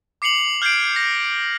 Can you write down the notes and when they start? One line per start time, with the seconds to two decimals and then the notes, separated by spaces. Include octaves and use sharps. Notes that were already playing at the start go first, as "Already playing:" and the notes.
0.22 D6 C7 C#7 F7 F#7
0.62 F6 G6 G#6 C7 D7
0.96 A#6